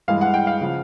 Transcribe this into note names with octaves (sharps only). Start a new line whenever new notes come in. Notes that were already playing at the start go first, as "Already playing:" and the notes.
G2 E3 G#3 F5
F#5
G5
F5
C#3 F3